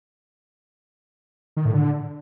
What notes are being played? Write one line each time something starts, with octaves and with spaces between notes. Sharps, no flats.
D#3
A2
D3